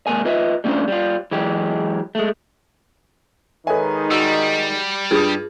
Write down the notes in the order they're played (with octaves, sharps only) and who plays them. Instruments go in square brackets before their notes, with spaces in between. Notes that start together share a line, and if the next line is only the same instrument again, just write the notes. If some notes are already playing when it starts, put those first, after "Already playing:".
[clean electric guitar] C3 F3 G#3 A#3 A#4 G#5
F4 B4 D#5 E5
G3 A3 C#4 D4 F4 C5
G3 F4
E3 F#3 G#3 G4
G#3 A3
[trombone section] D#3 G#3 D#4 [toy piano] A4 C#5 E5 [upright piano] B4 G#5
[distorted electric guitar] G3 [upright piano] F#4 [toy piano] A5 E6
[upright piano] G2 D#6 [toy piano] F4 G#4 A5